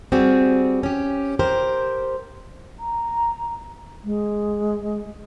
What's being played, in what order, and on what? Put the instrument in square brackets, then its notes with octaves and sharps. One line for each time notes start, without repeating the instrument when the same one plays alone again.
[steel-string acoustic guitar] G3 C4 F#4 G#4
C#4 G4
G4 A#4 C5
[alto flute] A#5
G#3